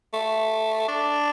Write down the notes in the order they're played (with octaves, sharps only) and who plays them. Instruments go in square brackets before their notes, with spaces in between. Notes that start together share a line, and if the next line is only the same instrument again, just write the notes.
[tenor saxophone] A3
D4